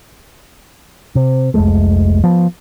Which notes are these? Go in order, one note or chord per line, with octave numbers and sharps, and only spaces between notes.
C3
F1 C2 G#3 A3
F3 B3